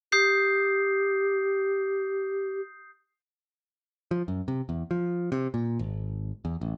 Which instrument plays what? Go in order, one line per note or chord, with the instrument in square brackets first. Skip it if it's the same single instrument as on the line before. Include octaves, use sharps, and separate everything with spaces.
[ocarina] G4 [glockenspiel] D#6 G6 C7
[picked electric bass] F3
F#2
C3
E2
F3
C3
A#2
G#1
E2
A1